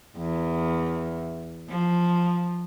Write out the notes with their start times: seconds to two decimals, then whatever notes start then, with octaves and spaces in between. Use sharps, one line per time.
0.17 E2
1.69 F3